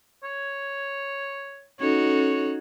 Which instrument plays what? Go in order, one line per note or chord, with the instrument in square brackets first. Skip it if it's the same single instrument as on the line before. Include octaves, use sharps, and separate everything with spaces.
[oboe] C#5
[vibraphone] C#4 A4 [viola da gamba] D#4 F#4 [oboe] C#5